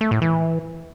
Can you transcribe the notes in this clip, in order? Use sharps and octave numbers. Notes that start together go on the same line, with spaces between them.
A3
A2
E3